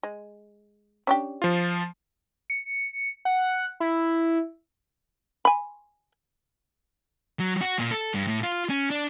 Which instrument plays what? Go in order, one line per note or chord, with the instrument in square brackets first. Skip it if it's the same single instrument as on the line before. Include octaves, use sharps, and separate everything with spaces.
[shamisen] G#3
C#4 D4 G4
[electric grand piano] F3 F4
[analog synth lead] C#7
F#5
E4
[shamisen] G#5 B5
[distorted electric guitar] F#3
F#4
A#2
A4
G2
A2
F4
C#4
D4